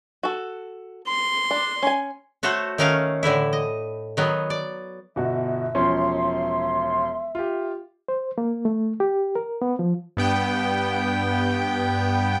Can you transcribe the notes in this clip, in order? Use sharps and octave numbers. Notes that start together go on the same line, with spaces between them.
F#4 A4
C6
D4
C#4 G#5
A3 F#4 A4 C5 C#5 F#5
D#3 A3 C#4 A#4 F5 F#5
A2 D3 E3 E4
D#5
D#3 F#3 B3
D5
G1 B2 F#4 E5
E1 F3 C#4 C6
F4 G4
C5
A#3
A3
G4
A#4
B3
F3
G2 B3 G5